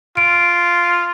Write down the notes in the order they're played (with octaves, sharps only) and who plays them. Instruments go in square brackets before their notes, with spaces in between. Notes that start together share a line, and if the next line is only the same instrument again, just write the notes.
[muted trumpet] F4 [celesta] D7